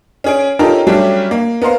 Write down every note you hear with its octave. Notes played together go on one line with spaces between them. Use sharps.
C#4 G#4 D7
C#4 D#4 F4 G4 A4 A#4
F#3 G3 A3 C#4 D4 G4
A#3
B3 A#4 C5 F5